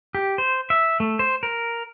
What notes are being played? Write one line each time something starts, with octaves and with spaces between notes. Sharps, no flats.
G4
C5
E5
A3
C5
A#4